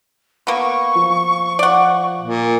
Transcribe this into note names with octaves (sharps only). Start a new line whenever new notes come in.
A#3 B3 C#6
F3
D5 F#5
A#2